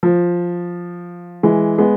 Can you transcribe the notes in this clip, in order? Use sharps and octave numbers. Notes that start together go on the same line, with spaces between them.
F3
E3 G#3
G#3 B3